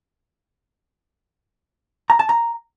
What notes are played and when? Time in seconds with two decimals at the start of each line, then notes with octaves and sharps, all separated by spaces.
2.10 A#5
2.19 A5
2.29 A#5